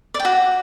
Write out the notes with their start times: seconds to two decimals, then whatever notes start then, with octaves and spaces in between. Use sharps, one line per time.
0.14 D5
0.20 G5
0.25 F#4